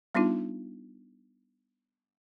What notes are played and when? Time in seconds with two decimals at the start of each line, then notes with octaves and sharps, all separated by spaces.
0.15 G3 B3 D4 D#4 F4